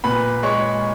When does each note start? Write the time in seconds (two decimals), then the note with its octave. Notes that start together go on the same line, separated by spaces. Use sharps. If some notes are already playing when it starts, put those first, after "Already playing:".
0.04 A#2 B4 B5
0.43 G#3 C#5 C#6